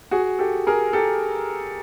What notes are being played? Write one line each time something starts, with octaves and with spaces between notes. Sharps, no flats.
F#4 G#4
G4 A4
G#4 A#4
G4 A4